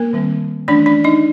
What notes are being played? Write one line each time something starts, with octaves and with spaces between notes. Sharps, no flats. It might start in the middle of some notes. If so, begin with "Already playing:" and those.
Already playing: A#3 A#4
D#3 G3 C4
E3 A3 C#4 D4 D5
D4 D5
D#4 D#5